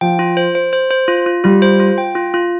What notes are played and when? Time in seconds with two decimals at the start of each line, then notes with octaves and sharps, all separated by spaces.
0.01 F3 G5
0.19 F4
0.37 C5
0.55 C5
0.73 C5
0.91 C5
1.08 F4
1.26 F4
1.44 G3 F4
1.62 C5
1.80 F4
1.98 G5
2.15 F4
2.34 F4